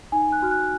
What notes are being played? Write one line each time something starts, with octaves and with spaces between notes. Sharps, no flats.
D#4 G#5
F#6
F#4 F6
F#6